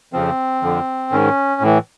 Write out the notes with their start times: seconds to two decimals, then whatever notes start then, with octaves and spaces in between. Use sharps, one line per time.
0.13 F2 C#3 F3 C4
0.62 F2 D3 F3
1.11 G#2 D#3 C#4
1.61 A2 E3